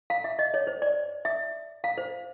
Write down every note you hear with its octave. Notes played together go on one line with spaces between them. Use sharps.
F5
E5
D#5
C#5
C5
D5
E5
F5
C5